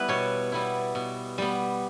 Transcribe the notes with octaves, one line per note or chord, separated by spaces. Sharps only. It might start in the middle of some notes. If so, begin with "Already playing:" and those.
Already playing: G3 B3 E4 B4
B2 C#5
G3 B3 E4
B2
G3 B3